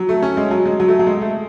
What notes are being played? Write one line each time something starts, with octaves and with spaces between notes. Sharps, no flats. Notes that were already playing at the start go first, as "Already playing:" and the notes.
Already playing: F#3
A3
C#4
G#3
F#3
G#3
F#3
A3
F#3
G#3
A3